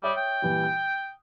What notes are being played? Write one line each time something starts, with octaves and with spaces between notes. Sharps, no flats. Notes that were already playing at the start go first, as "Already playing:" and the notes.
G3 C#5 E5 D#6
G5
A#2 E3 G3
G6